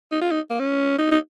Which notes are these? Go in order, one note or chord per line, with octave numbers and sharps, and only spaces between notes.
D#4
F4
D#4
A#3
C#4
D#4
D#4